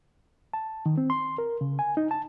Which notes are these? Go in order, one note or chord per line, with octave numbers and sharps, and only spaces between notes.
A5
D#3
C4
C6
A#4
C#3
G#5
D#4
A5